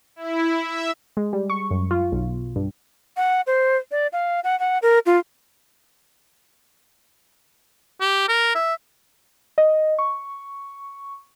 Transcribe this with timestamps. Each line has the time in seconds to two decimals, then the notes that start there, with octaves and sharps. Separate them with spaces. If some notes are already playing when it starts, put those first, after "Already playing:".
0.16 E4
0.61 E5
1.17 G#3
1.33 G3
1.50 C#6
1.71 F#2
1.91 F4
2.12 B1
2.56 G2
3.17 F#5
3.47 C5
3.91 D5
4.13 F5
4.44 F#5
4.60 F#5
4.82 A#4
5.06 F4
8.00 G4
8.28 A#4
8.55 E5
9.58 D#5
9.99 C#6